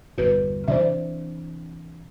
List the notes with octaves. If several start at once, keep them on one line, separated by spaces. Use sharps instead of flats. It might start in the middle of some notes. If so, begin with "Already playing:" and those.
G1 E2 A#2 F#4 B4
C3 E3 D4 C5 D5 E5